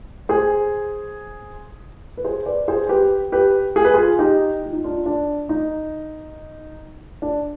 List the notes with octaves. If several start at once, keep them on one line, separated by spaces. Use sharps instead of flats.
G#4 C5
B4
G#4 C5
B4 D5
G#4 C5
G4 B4
G4 B4
G#4
B4
F4 G#4
D#4 G4
F4
D#4
D4 F4
D4
D#4
D4